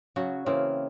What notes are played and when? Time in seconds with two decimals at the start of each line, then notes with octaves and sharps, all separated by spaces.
0.16 C#3 F#3 F#4
0.46 C#3 E3 A#3 C4